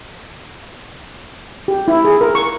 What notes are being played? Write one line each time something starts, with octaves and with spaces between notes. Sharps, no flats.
G4
E4
G#4
A#4
C#6